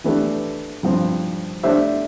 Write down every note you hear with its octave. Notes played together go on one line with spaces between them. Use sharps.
E3 A3 D4 G4 B4
G2 F3 C4
A3 D4 G4 C5 E5